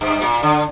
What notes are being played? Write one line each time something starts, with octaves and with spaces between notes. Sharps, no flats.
G2
A#2
D3